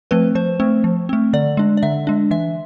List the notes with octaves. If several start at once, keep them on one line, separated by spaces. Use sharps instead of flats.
F3 A3 C4 B4
F3 C5
A3 C4
F3
A3 C4
D3 D5
G#3 D4
D5
D3 E5
G#3 D4
E3 E5